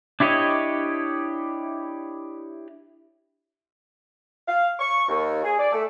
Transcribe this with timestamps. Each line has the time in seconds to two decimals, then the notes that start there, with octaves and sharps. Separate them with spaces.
0.20 D4 E4 G4 C#5 D#5
4.47 F5
4.79 C#6
5.08 D#2
5.44 G#4
5.59 D5
5.72 A3